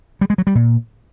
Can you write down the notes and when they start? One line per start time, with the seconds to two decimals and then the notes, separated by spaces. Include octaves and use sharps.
0.21 G3
0.30 G#3
0.38 F#3
0.47 G3
0.55 A#2